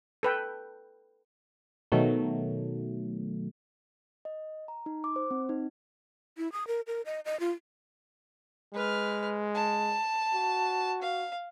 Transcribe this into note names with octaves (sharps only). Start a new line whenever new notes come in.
A4 B4 G5
B2 D#3 F#3 A3
D#5
A#5
D#4
D6
C5
C4
D#4
E4
D#6
A#4
A#4
D#5
D#5
F4
G#3 B4 F6
A5
F#4
F5